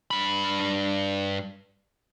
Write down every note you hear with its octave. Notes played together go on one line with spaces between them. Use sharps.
G2 B5